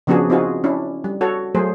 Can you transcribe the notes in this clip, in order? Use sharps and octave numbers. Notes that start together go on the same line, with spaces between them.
C#3 F3 B3 D4 F#4 G#4
C4 D#4 F4 F#4 G#4
C#4 D4 E4
G3
F#4 A4 C#5
F#3 A3 G#4 C5